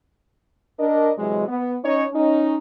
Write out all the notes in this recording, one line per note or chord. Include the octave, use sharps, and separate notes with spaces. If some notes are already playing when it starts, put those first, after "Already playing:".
D4 A#4 D#5
C3 E3 F#3 G#3
B3
C#4 D#4 C#5
C#4 D#4